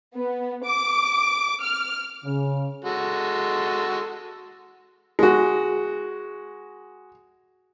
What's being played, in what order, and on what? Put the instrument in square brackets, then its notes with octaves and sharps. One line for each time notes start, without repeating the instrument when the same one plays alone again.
[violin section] B3
D6
F6
[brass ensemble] C#3
[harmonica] G#3 F#4 A4
[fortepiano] G#3 F#4